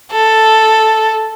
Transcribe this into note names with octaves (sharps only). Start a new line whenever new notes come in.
A4